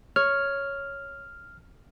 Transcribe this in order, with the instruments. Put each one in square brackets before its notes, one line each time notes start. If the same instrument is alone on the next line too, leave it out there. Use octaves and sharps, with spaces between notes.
[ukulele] C#5 [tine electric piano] F6